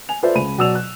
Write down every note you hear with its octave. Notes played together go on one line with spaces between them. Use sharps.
G#5 F7
F4 A4 B4 C5 D5 E5
C#2 B5 D#7
B2 F#3 D5 E6 E7 F7
F#6